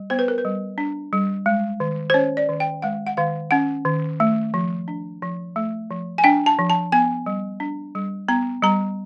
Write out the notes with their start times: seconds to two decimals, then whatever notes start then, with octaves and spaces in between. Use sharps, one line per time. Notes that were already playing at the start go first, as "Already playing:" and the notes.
Already playing: G3
0.10 B3 C5
0.19 B4
0.28 A#4
0.38 B4
0.45 G3
0.78 D4
1.13 G3
1.46 G#3
1.80 D#3
2.10 C5
2.14 C#4 C#5
2.37 D5
2.49 D#3
2.60 G5
2.82 G#3 F#5
3.07 F#5
3.17 D#3 F5
3.51 C#4 F#5
3.85 D#3
4.20 A3
4.54 F3
4.88 D4
5.22 F3
5.56 A3
5.91 F3
6.18 G#5
6.24 D4 G5
6.46 A5
6.59 F3
6.70 A5
6.92 B3 G#5
7.26 G3
7.60 D4
7.95 G3
8.28 B3 A#5
8.62 G3 A#5